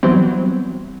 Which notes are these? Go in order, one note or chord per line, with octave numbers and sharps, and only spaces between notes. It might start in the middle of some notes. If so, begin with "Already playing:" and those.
E3 F#3 G3 B3 C4